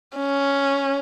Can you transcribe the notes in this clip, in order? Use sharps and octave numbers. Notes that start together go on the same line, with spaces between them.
C#4